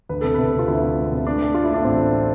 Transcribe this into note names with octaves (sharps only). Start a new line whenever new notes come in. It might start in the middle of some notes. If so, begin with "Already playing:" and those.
D2 B4
C3 A4
C3 B4
C3
F4
D2 E4
C3
G#3
C3
A3 D4
A3
A3 F4
E4
A3 D4
A1 C4
A3